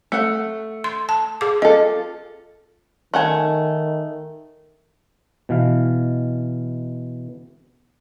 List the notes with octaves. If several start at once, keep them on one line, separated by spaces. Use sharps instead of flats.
A3 F#5
C6
A5
G#4 D6
F4 A4 D#5
D#3 A3 F#5 G#5
B2 E3 F5